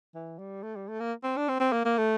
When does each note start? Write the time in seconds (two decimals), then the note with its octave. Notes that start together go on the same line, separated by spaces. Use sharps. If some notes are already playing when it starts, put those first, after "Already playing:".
0.14 E3
0.39 G3
0.63 A3
0.75 G3
0.88 A3
1.00 A#3
1.23 C4
1.37 D4
1.48 C4
1.60 C4
1.72 A#3
1.85 A#3
1.98 A3